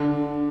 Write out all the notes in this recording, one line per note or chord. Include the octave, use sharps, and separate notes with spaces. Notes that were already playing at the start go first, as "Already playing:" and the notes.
Already playing: D3 D4